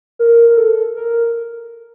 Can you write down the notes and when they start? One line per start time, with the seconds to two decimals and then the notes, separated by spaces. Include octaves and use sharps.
0.19 A#4
0.49 A#4
0.57 A4
0.96 A#4